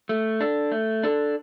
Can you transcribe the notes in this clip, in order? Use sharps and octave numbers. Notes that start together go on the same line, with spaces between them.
A3
D4 A4
A3
D4 A4